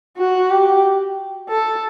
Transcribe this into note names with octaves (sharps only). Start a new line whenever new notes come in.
F#4
G4
A4